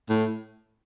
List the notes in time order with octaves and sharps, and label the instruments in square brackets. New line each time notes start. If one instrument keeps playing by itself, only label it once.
[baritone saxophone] A2